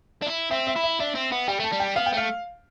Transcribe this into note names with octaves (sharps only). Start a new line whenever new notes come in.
D4
E4
C4 E5
E5
E4
E5
D4 E5
C4
B3
G3 G5
A3 A5
G3
G5
B3 F5
G5
A3 F5